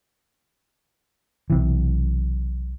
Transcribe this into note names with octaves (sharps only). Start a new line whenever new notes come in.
B1 C3 E3